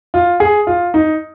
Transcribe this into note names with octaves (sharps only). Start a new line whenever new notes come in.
F4
G#4
F4
D#4